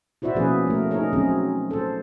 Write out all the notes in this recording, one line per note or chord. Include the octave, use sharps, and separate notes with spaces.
E4 F#4 C5 D5 E5
B2 F3 A#3 C#4 G#4 B4
A3 A#4
D#4 G#4 A#4 C#5
F#3 C4 C#4 G#4
A4 C5